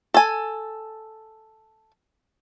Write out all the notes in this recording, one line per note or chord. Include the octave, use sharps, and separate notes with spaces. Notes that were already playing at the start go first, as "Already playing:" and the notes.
A4 G#5